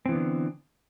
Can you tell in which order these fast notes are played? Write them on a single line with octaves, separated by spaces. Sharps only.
C4 E3 B3 D3